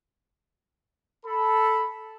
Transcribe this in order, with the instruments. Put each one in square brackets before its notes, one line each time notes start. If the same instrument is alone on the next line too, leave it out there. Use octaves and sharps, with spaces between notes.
[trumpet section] A4 B5